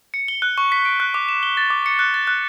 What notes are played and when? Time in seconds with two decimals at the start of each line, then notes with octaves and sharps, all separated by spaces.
0.14 C#7
0.28 G7
0.42 F#6
0.58 C#6
0.72 B6
0.85 D7
1.00 F#6
1.14 D6
1.29 E7
1.43 G7
1.57 A6
1.70 D6
1.86 C#7
1.99 F#6
2.14 A6
2.27 F#6